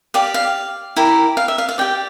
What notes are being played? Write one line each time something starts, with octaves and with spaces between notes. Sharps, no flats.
G4 D5 F5
F5
E4 G4 A#4
F5
E5
F5
F5
G4 D5 G5